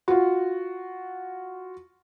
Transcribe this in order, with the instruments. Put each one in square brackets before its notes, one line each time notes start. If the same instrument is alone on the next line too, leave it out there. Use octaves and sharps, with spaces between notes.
[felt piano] F4 F#4